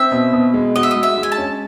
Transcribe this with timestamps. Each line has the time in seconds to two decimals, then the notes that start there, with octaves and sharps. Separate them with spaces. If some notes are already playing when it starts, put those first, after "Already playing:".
Already playing: C4 E5
0.11 B2
0.33 B2
0.54 G#3
0.75 F#4 D#5
0.83 E5
0.91 D#5
0.96 G#3
1.03 E5
1.18 G#3
1.23 G#5
1.32 A5
1.38 C#4